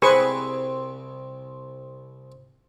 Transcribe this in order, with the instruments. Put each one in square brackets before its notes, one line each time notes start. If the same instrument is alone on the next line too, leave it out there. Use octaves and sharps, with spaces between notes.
[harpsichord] C2 C4 [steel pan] G#4 B4 C#6